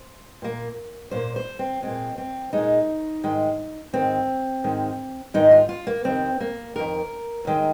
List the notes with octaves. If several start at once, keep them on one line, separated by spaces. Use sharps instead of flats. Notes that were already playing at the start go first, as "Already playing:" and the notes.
Already playing: C5
A#2 A#3
A#2 A#3 C5
C5
C4
A#2 G#3 C4
C4
A#2 G#3 D#4
G#2 D#3 G#3
G#2 D#3 G#3 C4
G#2 D#3 G#3
G#2 D#3 G#3 D#4
F4
F4
A#3
F2 C3 D#3 C4
A#3
F2 C3 D#3 A#4
D#2 D#3 G#3